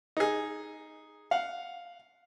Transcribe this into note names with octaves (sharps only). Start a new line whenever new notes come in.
D#4 G#4
F5 F#5